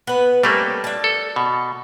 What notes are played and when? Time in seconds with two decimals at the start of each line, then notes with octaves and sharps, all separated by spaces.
0.07 B3 B4
0.43 G3 A3 A#3 C4 C#4 A4
0.84 D4 A5
1.04 A4
1.36 B2